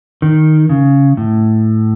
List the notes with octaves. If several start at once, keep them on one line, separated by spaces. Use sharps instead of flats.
D#3
C#3
A2